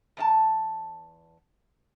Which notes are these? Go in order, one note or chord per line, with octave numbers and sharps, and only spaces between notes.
E2 D4 A5